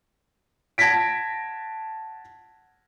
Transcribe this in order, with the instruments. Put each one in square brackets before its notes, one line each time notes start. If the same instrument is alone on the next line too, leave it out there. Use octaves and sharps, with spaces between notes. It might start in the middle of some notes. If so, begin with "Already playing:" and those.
[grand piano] F#5 A5 G#6 A#6 B6 D7